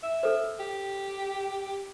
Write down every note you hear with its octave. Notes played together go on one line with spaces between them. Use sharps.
E5
A4 C5
G4